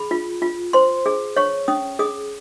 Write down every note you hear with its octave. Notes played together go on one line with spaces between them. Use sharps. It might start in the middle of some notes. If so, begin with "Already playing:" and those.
Already playing: G#4 B5
F4
F4
C5 C6
G#4
C#5 C#6
C#4 D#6
G#4 D#6